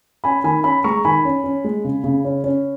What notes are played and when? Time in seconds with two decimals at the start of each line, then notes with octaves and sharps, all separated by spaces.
0.24 C#4 G#5 B5
0.44 D#3 G#5 B5
0.64 C#4 G#5 B5
0.84 G#3 A#5 C#6
1.05 D#3 G#5 B5
1.25 C#4
1.44 C#4
1.64 G#3
1.84 C#3
2.04 C#3
2.25 C#4
2.44 C#4